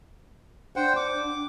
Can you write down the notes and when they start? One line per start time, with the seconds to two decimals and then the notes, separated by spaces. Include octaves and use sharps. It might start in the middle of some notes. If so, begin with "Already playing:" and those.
0.76 D4 C5 F#5 G5
0.96 D6